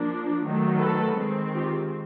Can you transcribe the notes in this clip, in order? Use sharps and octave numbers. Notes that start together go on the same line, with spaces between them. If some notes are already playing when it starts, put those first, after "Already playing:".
Already playing: F3 A#3 D4
D#3 F#3 A3
A4 B4
D#3 G#3 C4
F4 G4